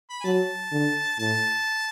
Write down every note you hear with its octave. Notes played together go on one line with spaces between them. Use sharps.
B5
G#5
F#3 A5
D3
A2 A5